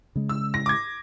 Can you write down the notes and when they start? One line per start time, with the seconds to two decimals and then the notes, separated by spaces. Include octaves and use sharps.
0.16 C#3 G#3
0.29 E6
0.54 A#6
0.66 D6 G#6